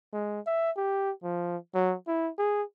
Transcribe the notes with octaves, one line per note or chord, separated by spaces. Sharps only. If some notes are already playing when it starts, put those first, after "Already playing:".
G#3
E5
G4
F3
F#3
E4
G#4